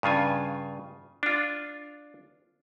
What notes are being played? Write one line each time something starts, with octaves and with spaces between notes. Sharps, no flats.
G2 C#3 F4 G#5
D4 F4